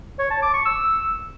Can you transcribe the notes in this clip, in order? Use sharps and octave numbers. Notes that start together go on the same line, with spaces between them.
C#5
A5
D6
C#6
E6